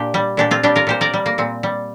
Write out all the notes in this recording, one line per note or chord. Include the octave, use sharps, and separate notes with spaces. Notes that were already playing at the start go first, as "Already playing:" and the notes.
Already playing: A#2 D4 G4
G3
A#2 D4 G4
C4 F4
G3 D4 G4
F4 A#4
A#2 G4 C5
A#4 D5
G3
A#3
A#2 C4
G3